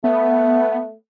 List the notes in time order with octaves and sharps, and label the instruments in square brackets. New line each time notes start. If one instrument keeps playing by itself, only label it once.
[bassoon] A3 [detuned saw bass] B3